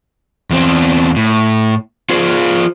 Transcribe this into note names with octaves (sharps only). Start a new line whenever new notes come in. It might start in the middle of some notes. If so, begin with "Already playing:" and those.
E2 C4
A2
F4 G#4 C5